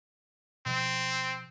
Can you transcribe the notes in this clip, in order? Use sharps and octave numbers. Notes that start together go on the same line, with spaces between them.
B2 F3 C4